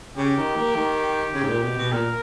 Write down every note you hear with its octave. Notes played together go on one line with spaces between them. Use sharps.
C#3 G4
D#3
A#3
D#3
C#3
G#2
A#2
B2
B2
A#2 A#4